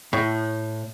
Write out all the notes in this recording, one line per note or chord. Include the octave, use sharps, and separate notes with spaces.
A2